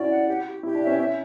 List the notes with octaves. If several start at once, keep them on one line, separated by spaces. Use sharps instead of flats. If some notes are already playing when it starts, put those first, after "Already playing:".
Already playing: C#4 E4 F#4 D5
F#5
G4
G4
E4 G4
D4
E5
C#4
C#4 E5